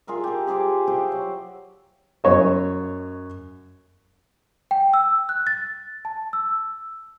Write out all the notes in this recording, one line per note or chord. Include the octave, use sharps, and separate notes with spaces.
F4 G#4 A#4 E5
G4 A#4
G4 G#4 C5 D6
G4 C5 E5 F#5
F#3
F#2 C#5 D#5
G5
E6
F#6
A6
A5
E6